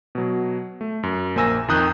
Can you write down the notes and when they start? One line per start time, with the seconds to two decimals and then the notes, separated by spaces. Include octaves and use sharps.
0.15 B2 F#3
0.81 A3
1.03 F#2
1.35 A#1 A#3 C5 G#5 E6 A#6
1.68 F2 D#3 A#5 D#6 F#6 G6